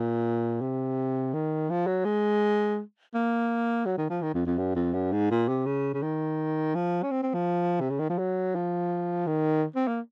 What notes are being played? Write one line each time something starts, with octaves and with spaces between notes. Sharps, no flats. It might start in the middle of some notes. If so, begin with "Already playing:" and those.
Already playing: A#2
C3
D#3
F3
F#3
G#3
A#3
F#3
D#3
F3
D#3
F2
F2
F#2
F2
F#2
G#2
A#2
C3
C#3
C#3
D#3
F3
C#4
C4
C4
F3
C3
C#3
D#3
F3
F#3
F3
D#3
C4
A#3